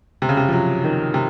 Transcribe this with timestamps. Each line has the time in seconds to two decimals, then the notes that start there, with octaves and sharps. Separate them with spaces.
0.22 C3
0.29 C#3
0.37 C3
0.48 F3
0.53 F#3
0.84 D#3
1.14 C3